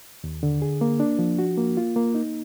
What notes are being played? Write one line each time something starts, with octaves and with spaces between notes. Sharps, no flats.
D#2
D3
G#4
A#3
D4
F3
F#4
A#3
F4
A#3
D#4